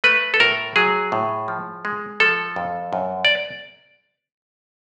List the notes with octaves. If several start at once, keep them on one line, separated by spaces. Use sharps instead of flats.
A3 B4
A4
A2 A#4
F#3 G#4
A2
F3
G#3
F3 A4
F2
F#2
D5